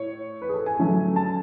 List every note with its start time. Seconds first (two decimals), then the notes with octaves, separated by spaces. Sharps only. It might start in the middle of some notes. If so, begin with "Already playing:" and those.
Already playing: A2 C#5
0.42 B4
0.49 G#4
0.54 A4
0.66 G#5
0.79 D3 F#3 A3 C#4
1.16 A5